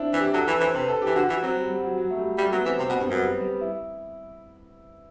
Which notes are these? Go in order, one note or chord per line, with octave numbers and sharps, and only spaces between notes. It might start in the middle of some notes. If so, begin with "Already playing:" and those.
Already playing: C4 D4 E4
E3
G4
F#3 A4
E3 B4
E3 C5
C3 B4
A4
E3 G4
D3 F#4
E3 F#4
F#3 C4
G3
G3
F#3
F#3
A3
G3
G3 A3
F#3 B3
E3 C4
C3 C4
B2
B3
G2
F#2 B3
G3
G3
E4